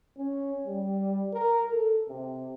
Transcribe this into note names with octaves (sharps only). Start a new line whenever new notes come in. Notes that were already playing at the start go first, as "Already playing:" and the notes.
C#4
G3
A#4
A4
C3